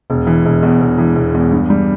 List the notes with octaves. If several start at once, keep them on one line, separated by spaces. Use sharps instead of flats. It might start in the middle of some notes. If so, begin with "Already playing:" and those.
E1
E3
E1
E2
E1
E3
E1
E2
G2
G3